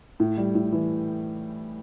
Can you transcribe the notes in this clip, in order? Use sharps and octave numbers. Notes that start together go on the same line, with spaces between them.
A2
G3
A2
E3